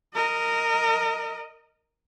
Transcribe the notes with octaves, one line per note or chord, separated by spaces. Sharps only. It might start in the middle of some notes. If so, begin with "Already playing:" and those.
A#4 D#5